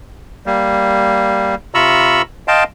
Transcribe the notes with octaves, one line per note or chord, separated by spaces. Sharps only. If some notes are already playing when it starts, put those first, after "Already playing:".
G3 A#3
C3 F4 A#5 B5 C#6 E6
D#5 F5 G5 A5 C6